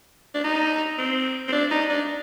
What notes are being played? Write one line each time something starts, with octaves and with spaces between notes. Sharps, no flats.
D4
D#4
C4
C4
D4
D#4
D4